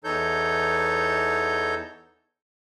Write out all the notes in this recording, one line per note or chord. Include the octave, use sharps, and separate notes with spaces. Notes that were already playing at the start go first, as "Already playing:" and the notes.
E2 E3 D#4 A4 C#5 G6